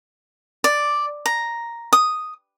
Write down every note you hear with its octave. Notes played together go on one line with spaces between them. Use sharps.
D5
A#5
D#6